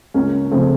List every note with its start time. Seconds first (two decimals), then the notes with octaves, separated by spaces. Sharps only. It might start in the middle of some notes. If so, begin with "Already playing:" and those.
0.14 C#2 A#3 C#4
0.51 C#3 F3 A3 C4